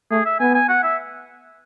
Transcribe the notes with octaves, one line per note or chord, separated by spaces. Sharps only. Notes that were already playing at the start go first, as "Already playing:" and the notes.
A3 G#4
E5
B3 G#5
G#5
F#5
E5